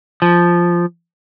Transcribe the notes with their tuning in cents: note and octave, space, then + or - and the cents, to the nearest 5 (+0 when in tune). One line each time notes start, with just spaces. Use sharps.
F3 -5